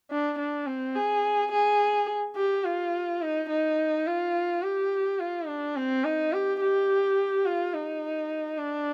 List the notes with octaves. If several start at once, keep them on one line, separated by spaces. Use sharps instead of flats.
D4
D4
C4
G#4
G#4
G4
F4
D#4
D#4
F4
G4
F4
D4
C4
D#4
G4
G4
F4
D#4
D4